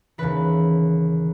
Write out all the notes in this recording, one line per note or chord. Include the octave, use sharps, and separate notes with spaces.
D#2 C#3 E3 B4